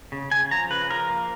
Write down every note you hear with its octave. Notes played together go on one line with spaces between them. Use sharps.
C#3
C#3 G#5
F3 A#5
C#3 B4
F3 A#4
A#3